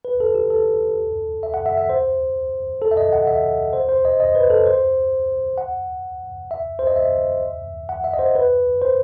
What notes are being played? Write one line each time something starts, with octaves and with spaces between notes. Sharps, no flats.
B4
A4
G4
A4
E5
F#5
E5
E5
C5
A4
E5
D#5
F#5
E5
C5
C5
D#5
D#5
B4
A4
C5
F#5
E5
C5
D#5
E5
F#5
E5
D#5
C5
B4
C5